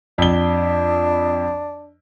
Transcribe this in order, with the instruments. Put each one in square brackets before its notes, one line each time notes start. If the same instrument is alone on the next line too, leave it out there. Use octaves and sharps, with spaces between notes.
[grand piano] F2 G7 [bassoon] D4